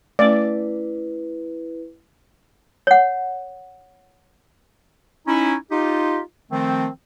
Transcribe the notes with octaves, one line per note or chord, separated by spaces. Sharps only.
A3 C#4 E4 B4 D5
C#5 F#5
C#4 D#4 E4
D#4 F4 G4
D#3 F3 A3 C4